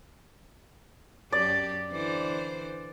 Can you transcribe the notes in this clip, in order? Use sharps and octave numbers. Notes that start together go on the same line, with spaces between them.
F#2 G4 D5
D3 E3 C5